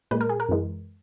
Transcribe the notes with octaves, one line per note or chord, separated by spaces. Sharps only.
A#2 G#3 B4
A#4
G#4
A#4
F#2 E3 G#3